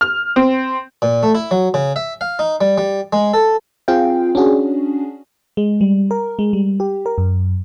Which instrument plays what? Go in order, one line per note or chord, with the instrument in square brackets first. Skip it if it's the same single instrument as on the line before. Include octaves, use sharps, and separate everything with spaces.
[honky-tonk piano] F6
C4
[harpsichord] A#2
A3
E4
F#3
C#3
E5
F5
D#4
G3
G3
G#3
A4
[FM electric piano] C4 F4 G#4 F5 G5
C#4 D4 F#4 G#4
G#3
G3
A#4
G#3
G3
G4
A#4
F#2